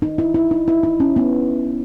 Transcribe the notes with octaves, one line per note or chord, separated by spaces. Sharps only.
D#4
E4
E4
D#4
E4
D#4
C#4
B3